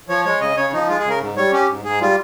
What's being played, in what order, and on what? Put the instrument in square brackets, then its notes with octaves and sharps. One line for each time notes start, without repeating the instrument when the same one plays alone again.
[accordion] F3 C#5
G#3 C#5
C#3 D#5
C#3 C#5
F3 D#4
G#3 F4
G#4
C#3 A#4
G#2
G3 C#5
C#4 G4
G#2
G#2 G#4
G3 F4